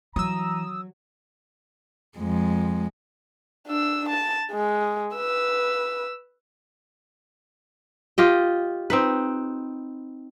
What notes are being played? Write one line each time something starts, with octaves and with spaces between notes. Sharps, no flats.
E3 F#3 A#5 D#6 E6
F2 G#3
D4 E6
A5
G#3
B4 E6
F4 G4 D#5
C4 D#4 B4